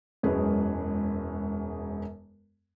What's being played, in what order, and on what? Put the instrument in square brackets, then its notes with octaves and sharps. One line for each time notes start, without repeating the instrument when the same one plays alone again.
[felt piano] E1 F#2 G#3 G#4 B4